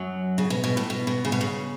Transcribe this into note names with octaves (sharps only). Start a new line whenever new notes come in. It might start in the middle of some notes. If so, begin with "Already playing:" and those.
Already playing: F#2 F#3
C#3
B2
B2
A2
B2
B2
C#3
B2
C#3